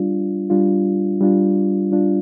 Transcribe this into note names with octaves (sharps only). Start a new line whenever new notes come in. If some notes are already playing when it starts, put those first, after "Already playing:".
Already playing: G3 D4 F4
G3 D4 F4
G3 D4 F4
G3 D4 F4